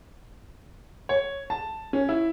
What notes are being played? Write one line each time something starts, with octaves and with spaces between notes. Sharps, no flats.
C#5
A5
C#4
E4